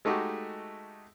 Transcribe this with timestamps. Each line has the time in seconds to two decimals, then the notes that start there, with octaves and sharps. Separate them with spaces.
0.05 G#3 A3 D#4 F#4 G4